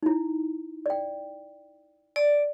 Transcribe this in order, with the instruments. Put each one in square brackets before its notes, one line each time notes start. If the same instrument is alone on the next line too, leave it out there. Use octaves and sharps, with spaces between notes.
[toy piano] D#4 E4
D5 G5
[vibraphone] D5